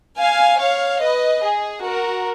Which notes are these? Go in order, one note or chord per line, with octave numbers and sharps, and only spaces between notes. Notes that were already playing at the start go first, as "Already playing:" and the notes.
F5 G#5
C#5 F5
B4 D#5
G#4
F#4 A#4